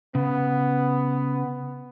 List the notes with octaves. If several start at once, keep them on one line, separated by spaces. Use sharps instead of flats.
C#3 B3